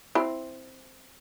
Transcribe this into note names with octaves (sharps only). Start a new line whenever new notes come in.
C4 E4